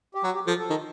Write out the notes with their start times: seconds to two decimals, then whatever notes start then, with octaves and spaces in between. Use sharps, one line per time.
0.15 G4
0.23 F#3 F#4
0.35 G4
0.47 F3 A4
0.59 A4
0.70 D#3